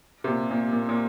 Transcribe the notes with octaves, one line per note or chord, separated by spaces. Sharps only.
C3
A#2
A#2
A#2
A#2